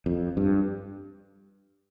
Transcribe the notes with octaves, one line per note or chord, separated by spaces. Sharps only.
F2
G2